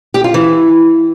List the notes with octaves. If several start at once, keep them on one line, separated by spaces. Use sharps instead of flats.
G4
F4
E3